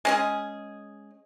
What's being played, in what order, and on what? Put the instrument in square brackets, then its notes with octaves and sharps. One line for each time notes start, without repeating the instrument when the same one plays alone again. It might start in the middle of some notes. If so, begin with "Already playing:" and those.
[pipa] G#3 C#4 G#4